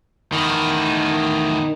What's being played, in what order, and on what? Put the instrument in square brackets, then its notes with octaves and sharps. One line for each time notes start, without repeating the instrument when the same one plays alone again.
[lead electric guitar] E2 A2 [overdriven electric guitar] D#3